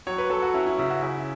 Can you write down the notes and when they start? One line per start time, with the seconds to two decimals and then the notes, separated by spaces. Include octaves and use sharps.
0.07 F#3 C#5
0.18 B4
0.30 F#3 A4
0.42 F#4
0.54 C#4 E4
0.66 E4
0.78 C#3 E4
0.91 F#4
1.02 C#3 E4